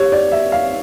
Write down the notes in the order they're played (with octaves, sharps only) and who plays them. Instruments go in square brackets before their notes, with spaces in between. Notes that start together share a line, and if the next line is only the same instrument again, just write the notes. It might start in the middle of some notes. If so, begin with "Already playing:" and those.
Already playing: [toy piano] G4 [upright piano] C#5
[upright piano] D5
E5
F5